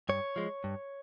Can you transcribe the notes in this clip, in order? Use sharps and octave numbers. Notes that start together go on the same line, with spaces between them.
G2 C#5
F3 G#3
G2